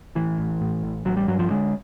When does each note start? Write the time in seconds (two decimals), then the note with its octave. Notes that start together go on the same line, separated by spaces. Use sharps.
0.15 A2 E3
0.38 A1
0.61 A2
0.83 A1
1.05 A1 F#3
1.17 G3
1.28 G2 F#3
1.39 F3
1.50 D3 G#3